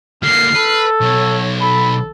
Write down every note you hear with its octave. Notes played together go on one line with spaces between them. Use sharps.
D3 A#3 F6 C7
A4 B4
B1 C#5
A4 B5